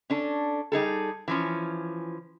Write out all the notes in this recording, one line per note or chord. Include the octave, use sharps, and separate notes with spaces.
C#4 D4 A4
G3 D#4 G#4 A4
E3 F3 C#4